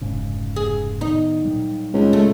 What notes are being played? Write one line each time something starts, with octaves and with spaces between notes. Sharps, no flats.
F1 G#2 C#3
G#4
A2 D#3 B3 D#4
A#2 F#3 G3
C#2
A3